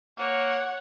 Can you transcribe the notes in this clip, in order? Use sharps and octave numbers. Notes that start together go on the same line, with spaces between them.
A#3 C#5 F#5